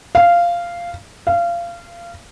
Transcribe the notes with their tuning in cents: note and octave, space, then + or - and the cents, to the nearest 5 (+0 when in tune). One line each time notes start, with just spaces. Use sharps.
F5 -10
F5 -25